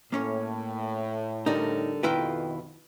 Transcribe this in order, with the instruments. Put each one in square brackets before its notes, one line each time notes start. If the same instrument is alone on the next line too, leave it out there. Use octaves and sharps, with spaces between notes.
[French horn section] A2 [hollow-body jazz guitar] A#3 C#4 C#5
[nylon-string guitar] D3 G3 A#4 [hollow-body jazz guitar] D#4
[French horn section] F2 B2 [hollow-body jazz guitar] D#3 E4 F4 [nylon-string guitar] B4 G5